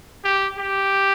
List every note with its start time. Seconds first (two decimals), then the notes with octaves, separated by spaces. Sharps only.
0.24 G4
0.58 G4